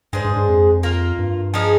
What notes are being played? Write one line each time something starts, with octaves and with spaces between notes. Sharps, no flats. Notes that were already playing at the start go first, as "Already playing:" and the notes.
G2 G#3 D4 G#4 C5
G2
G2
F2
A#3 F4 A#4
G2
F3 G#3 D#4 G#4